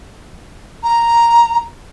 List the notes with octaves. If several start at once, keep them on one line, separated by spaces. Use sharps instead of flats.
A#5